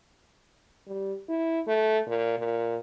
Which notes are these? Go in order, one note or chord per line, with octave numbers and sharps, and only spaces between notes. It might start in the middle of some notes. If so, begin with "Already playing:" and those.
G3
E4
A3
A#2
A#2